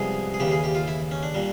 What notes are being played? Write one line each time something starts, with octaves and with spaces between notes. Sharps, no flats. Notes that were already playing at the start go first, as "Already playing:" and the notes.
Already playing: C2 C3 F3 G#3 B3 G#4
G#4
D#2 C#3 E3 G4
G#4
G4
F4
E4
C#4
D4
A#2 G3